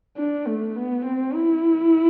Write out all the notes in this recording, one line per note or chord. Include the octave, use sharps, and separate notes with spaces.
D4
A3
B3
C4
E4